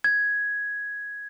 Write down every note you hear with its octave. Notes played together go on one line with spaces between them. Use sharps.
G#6